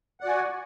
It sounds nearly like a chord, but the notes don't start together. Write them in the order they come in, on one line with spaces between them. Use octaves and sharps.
F#5 D5 F#4 G#5